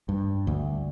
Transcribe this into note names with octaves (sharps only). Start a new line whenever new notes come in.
G2
D2